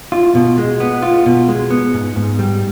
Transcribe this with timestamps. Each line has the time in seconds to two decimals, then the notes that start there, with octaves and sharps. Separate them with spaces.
0.12 F4
0.35 B2
0.58 G#3
0.80 B3
1.02 F4
1.26 B2
1.48 G#3
1.71 B3
1.94 G#2
2.16 G#2
2.39 G3